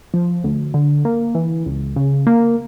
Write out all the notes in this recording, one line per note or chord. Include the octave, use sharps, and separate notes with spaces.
F3
D2
D3
A#3
E3
C#2
C#3
A#3